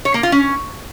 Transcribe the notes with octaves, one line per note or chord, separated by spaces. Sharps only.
C#5
A#3
F4
C#4